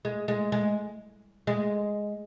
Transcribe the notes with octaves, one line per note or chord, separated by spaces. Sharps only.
G#3
G#3
G#3
G#3